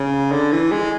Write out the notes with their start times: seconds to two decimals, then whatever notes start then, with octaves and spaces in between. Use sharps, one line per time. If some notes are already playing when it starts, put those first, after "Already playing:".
Already playing: C#3
0.32 D3
0.52 E3
0.71 G#3